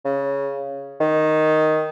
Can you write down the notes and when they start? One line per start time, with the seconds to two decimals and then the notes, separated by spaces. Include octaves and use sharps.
0.05 C#3
1.00 D#3